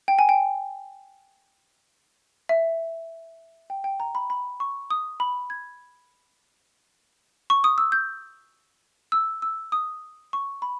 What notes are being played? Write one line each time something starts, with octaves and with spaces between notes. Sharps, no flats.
G5
G#5
G5
E5
G5
G5
A#5
B5
B5
C#6
D#6
B5
G#6
C#6
D#6
E6
G6
E6
E6
D#6
C#6
B5